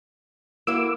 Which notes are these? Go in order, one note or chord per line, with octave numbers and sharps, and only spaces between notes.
A#3 E4 F#4 D6 E6